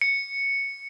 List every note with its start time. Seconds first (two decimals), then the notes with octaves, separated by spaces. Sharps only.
0.01 C#7